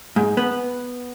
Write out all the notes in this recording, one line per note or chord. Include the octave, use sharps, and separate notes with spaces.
G#2
B3